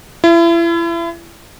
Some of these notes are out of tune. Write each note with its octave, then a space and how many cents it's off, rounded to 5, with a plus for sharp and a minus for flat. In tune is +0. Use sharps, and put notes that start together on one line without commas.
E4 +35